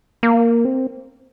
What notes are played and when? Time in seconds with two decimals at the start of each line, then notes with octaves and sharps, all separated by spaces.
0.23 A#3
0.65 C4